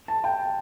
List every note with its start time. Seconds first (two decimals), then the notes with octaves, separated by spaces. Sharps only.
0.08 A5
0.24 G5